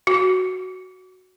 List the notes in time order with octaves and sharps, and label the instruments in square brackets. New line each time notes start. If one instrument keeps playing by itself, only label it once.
[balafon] F#4